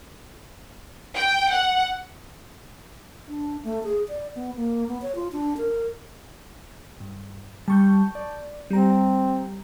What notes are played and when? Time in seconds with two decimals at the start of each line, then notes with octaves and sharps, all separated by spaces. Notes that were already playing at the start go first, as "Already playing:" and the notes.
1.15 G5
1.51 F#5
3.28 D4
3.64 A3
3.84 G#4
4.09 D5
4.35 B3
4.56 A#3
4.88 B3
5.02 C#5
5.15 F4
5.33 D4
5.57 A#4
7.00 G2
7.68 G3 A5 C#6 G6
8.15 D5
8.70 G3 C4 A#5